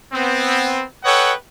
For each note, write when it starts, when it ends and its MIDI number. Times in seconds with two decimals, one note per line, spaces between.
0.13 0.84 59
0.13 0.84 60
1.04 1.33 69
1.04 1.33 71
1.04 1.33 73
1.04 1.33 75
1.04 1.33 78
1.04 1.33 79